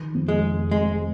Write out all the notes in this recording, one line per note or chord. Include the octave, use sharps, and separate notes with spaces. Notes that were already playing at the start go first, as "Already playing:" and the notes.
Already playing: D#3
F2
G#3
F1
G#3 C4